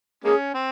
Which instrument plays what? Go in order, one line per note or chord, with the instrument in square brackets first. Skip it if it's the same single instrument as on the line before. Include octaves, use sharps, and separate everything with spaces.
[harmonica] G#3 A#3 C#4 [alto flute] G#4
[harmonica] C4